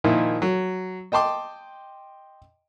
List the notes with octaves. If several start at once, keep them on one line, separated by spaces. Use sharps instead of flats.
A#2 D#3 F3 D#4 E4
F#3
D#5 G5 A5 C6 D6